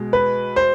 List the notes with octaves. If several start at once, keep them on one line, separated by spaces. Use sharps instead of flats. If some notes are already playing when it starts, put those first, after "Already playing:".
Already playing: B2 G#3
B4
C5